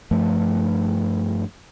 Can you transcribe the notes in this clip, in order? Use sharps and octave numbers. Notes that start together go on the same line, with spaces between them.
G2 F3 A3